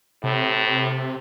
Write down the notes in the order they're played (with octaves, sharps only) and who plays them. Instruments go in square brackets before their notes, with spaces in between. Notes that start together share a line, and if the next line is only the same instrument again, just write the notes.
[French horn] A2 [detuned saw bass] C3